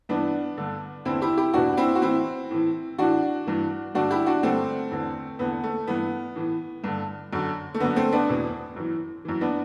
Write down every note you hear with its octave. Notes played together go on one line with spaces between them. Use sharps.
G2 E3 B3 D4
G2 D3
E2 D3 C4 E4
E4 G4
E4 G4
E2 B2 D4 F#4
C4 E4
F#4
A2 E3 C4 E4
A2 E3
A2 E3 D4 F#4
G2 E3
G2 D3 D4 F#4
E4 G4
D4 F#4
G2 D3 A3 C4
E2 D3
E2 D3 B3
A3
G2 E3 B3
A2 E3
G2 D3
F#2 D3
A3
F#2 D3 B3
A3 C4
B3 D4
E2 B2
F#2 E3
F#2 E3
B3 D4